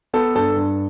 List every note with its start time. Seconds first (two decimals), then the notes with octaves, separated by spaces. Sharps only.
0.13 B3 A4
0.35 G2 A4
0.57 G2